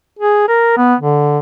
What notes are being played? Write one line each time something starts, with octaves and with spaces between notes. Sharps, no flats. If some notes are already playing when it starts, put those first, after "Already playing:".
G#4
A#4
B3
D3